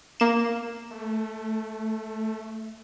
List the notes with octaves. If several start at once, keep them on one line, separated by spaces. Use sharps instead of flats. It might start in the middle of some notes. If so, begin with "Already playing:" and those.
A#3 E7
A3